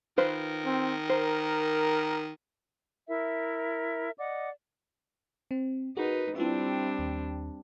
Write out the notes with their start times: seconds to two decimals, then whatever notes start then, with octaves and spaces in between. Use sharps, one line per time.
0.18 D#3 F4 B4 C5
0.65 C4
1.09 A#4 C5
3.07 E4 A#4 E5
4.18 D5 D#5 F#5 D6
5.51 C4
5.97 D#4 F#4 G#4 A#4 B4
6.36 G3 C4 D4 E4 F4 E5
6.99 D#2